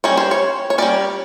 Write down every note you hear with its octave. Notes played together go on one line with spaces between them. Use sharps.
G3 A#3 C#4 C#5
C5
C#5
C#5
G3 A#3 C#4 D5